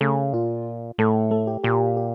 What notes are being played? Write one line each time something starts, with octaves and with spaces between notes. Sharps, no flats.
C#3 A3 A4
A#2 F4
A2 A3 A4
A3 A4
G4
A#2 G4
G4